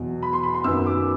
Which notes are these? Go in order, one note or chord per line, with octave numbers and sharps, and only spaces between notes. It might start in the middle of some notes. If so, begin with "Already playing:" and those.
Already playing: E2 B2 F#3
B5
C6
B5
C6
F#2 D#3 F#3 B3 E6
D6